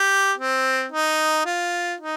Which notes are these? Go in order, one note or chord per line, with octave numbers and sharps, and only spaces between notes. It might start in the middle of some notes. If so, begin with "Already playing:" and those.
Already playing: G4
C4
D#4
F4
D#4